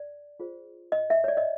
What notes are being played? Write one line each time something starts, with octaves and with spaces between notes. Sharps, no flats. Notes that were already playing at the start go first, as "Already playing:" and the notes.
Already playing: D5
F4 G#4 C5
D#5
E5
C#5
D5
D#5